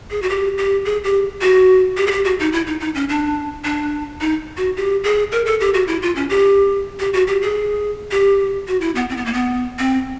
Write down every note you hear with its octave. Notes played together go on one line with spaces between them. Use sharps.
G#4
F#4
G4
G4
G#4
G4
F#4
G4
G#4
G4
F#4
D#4
E4
D#4
D#4
C#4
D4
D4
D#4
F#4
G4
G#4
A#4
A4
G4
F#4
E4
F4
C#4
G4
G4
F#4
G4
G#4
G4
F#4
E4
B3
C4
B3
A#3
B3
C4